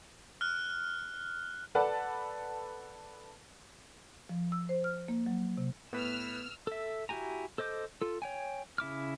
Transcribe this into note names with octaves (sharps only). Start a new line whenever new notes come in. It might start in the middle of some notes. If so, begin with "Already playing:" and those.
F6 F#6
A4 B4 D5 F#5 A5
F3
E6
C5
F6
A#3
F#3
C3
A2 B3 B4 E6 F6
A4 E5
E4 F#4 G4 G#5 A#5
A4 C5 D#5 D6 G6
F4 A4
C#5 G5 G#5
C#3 E4 D6 F6